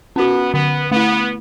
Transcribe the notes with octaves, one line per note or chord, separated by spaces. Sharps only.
B3 C#4 F#4
D3 B3
A3 B3 E4